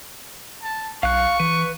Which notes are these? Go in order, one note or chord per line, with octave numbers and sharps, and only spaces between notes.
A5
B1 F5 C#6 F#6
E3 B4